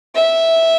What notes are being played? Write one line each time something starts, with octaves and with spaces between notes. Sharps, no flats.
E5